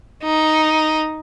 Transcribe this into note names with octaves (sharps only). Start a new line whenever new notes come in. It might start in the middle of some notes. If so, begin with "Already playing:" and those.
D#4